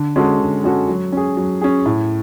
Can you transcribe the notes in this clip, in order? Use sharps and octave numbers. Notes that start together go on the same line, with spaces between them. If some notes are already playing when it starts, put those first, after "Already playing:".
Already playing: D3
G#3 C#4 F#4 A4
D3
G#3 C#4 F#4 A4
F#3
C#4 G#4
F#3
C#4 G#4
A2